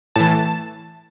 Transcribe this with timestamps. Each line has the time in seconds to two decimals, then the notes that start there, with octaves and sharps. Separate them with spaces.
0.16 A2 E3 A5